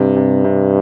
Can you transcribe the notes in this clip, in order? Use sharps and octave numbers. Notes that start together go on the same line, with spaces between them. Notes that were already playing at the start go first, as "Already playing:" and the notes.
Already playing: G2 C3
C3
C3